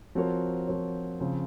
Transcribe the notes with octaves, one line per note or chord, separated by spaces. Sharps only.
F3 C4 F#4 A#4 C#5
F3 C4 F#4 A#4 C#5
C#3 F3 C4